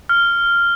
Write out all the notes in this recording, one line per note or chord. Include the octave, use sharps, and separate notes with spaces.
F6